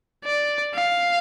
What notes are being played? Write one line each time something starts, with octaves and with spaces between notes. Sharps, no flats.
D5
F5